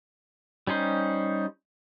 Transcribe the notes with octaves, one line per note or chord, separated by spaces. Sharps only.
G3 C#4 D#4 C5